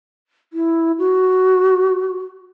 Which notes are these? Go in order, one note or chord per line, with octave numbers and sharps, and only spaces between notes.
E4
F#4